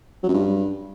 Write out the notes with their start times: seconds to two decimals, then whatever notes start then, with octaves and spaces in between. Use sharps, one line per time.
0.23 F#3
0.29 F#2
0.34 G2